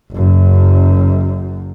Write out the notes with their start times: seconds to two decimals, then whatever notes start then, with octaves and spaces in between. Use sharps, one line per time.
0.12 F#1 F#2